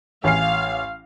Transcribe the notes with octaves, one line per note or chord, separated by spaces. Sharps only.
A1 F5 G#5 C7